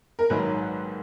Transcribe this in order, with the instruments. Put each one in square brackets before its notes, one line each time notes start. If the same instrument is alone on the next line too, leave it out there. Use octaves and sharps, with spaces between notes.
[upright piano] A#4
A#1 G#2 D#3 F#3 B4